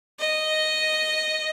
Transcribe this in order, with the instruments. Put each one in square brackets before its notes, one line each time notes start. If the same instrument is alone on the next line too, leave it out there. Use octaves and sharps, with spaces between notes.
[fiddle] D#5